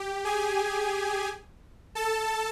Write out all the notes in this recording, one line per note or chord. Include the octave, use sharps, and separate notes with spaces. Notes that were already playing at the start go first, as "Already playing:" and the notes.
Already playing: G4
G#4 G#5
A4 A5